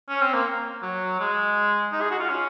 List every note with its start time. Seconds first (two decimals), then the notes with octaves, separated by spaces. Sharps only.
0.09 C#4
0.21 C4
0.34 A#3
0.82 F#3
1.20 G#3
1.92 D#4
2.01 G#4
2.11 F#4
2.20 F4
2.30 C#4